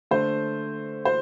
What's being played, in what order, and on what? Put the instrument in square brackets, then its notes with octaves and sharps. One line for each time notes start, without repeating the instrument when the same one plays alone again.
[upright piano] D3 A3 C5
C5